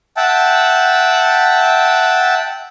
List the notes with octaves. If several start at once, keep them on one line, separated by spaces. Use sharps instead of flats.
E5 F#5 G5 A5